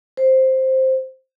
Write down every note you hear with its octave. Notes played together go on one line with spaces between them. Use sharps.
C5